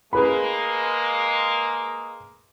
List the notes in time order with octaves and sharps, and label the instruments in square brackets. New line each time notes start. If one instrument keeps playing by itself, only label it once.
[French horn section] G#3 A#3 [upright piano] G#4 B4 B5